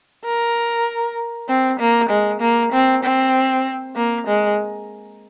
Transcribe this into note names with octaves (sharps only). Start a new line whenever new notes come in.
A#4
C4
A#3
G#3
A#3
C4
C4
A#3
G#3